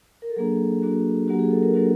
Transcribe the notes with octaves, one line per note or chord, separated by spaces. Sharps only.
A#4
A4
F#3 A#3 D4 G#4
F#3 A#3 D4 F#4
F#3 A#3 D4 F#4 G4
G#4
A4
A#4
F#3 A#3 D4 F#4 A4